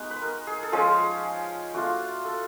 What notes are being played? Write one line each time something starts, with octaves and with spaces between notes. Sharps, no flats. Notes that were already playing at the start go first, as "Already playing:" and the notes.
Already playing: G#3 B3 D#4 F#4
B4
A#4
G#4
A4
F3 G#3 C#4 G#4
A3 D4 F4 F#4
A4